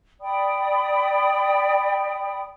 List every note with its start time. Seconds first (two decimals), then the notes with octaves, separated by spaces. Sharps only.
0.21 D5 G5 B5 D#6